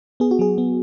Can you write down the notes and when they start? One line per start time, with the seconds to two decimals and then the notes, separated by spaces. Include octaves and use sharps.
0.20 B3 G#4
0.31 F#4
0.39 F#3 G#4
0.58 B3